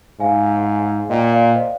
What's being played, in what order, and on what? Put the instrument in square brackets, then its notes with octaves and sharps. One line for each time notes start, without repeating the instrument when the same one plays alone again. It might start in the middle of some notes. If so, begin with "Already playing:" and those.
[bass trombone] G#2 [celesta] F5 G#5
[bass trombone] A#2 [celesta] D#5 G5
[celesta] D5 F5
C5 D#5